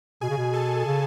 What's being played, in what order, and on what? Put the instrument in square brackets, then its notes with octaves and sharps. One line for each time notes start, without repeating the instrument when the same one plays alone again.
[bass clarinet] B2 [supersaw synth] G#4 G#5
[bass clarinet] C#3
B2
[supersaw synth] A4 A5
[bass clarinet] C#3